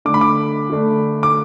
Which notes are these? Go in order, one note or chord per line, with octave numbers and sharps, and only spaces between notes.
D3 A3 D4 D6
B5
D6
D3 A3 D4
D6